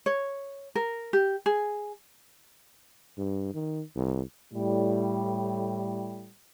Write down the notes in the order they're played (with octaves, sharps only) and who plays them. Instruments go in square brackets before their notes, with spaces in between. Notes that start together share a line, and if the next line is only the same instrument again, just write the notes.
[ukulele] C#5
A#4
G4
G#4
[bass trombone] G2
D#3
C2
[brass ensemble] A2 G3